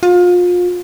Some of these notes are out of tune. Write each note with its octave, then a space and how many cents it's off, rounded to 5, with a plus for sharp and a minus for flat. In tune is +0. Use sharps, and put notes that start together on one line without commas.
F4 +30